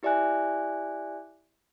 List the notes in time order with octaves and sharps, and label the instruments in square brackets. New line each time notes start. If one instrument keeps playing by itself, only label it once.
[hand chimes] E4 G4 D5 E5 G#5 F#6